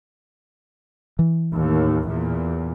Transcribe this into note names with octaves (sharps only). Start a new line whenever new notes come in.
E3
D#2 A2
E2 A#2